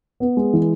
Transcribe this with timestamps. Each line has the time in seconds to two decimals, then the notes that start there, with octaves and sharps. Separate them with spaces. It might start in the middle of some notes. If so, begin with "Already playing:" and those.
0.20 B3
0.37 G#3
0.53 E3